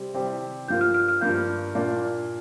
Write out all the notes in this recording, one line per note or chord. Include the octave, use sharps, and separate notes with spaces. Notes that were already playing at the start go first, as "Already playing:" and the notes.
Already playing: C3 G3 C4 G4
C3 G3 C4 G4
G2 F3 A#3 F4 G6
F6
F6
F6
G2 F3 A#3 F4 G6
A#2 A#3 D4 F4